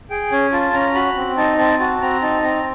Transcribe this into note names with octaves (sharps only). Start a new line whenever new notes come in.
G#4 G5
C#4 G#5
F4 A5
C#4 A#5
F#4 B5
C4
D#4 A5
C4 A5
F#4 A5
C4 A#5
D#4 A5
C4 A#5